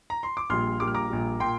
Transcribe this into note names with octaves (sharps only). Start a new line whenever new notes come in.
A#5
C6
D6
A#1 A#2 G3 C6 F6
A#1 A#2 G3 D6
F6
A#5 D6
A#1 A#2 G3
A#2 G5 C6